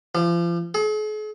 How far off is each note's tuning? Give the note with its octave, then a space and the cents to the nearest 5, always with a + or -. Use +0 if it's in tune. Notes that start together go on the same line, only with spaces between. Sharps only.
F3 -35
G#4 +45